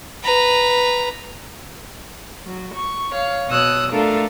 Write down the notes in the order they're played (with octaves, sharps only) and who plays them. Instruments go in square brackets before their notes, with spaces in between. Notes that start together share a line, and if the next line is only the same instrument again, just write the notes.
[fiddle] B4 A#5
[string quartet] F#3
C#6
C#5 F5
B2 C#5 D#6 E6 F#6
A3 D4 F4 A4 A#4